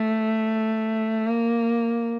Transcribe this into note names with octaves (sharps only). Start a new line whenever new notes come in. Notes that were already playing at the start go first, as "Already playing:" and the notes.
Already playing: A3
A#3